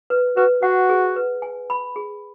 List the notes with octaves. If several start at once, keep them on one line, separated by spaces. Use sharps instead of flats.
B4
F#4 B4
F#4 F#5
G#4
B4
G#5
B5
G#4